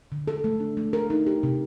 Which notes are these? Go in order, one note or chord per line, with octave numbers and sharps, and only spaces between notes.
D3
A4
A3
D4
A3
A#4
D#4
G4
C3